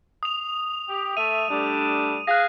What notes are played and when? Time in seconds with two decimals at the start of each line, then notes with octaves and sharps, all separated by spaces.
0.23 D#6 F7
0.89 G4
1.17 A3 E5 D#7
1.50 G3 A3 D4
2.27 G#4 F5 F#6 A#6